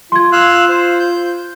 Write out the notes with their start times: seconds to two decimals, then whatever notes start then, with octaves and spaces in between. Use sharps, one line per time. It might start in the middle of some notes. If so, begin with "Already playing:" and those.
0.12 F4 C6 G#6
0.32 F5 E6 F#6
0.69 C5
1.00 G6